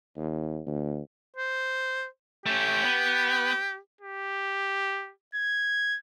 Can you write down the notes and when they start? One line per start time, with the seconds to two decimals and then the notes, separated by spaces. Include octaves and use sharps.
0.17 D#2
0.67 D2
1.36 C5
2.46 A3 C#4 G4
2.84 B3
4.01 G4
5.35 G#6